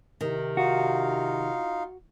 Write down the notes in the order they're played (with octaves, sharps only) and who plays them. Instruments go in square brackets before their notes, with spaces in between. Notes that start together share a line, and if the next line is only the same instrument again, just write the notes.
[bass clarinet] C3 [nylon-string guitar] D#3
[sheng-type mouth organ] D#4 F4 F5 [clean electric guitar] F#4